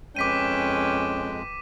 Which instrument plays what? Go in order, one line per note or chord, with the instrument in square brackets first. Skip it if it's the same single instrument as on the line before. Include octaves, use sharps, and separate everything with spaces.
[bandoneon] F2 G#3 [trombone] C#4 [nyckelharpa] B4 G5 [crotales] D6 B6 D#7